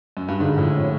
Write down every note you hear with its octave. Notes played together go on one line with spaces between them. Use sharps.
F#2
G2
G#2 D3
A2 F3
C#4